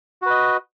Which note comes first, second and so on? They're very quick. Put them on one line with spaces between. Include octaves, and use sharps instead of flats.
F#4 B4 D#5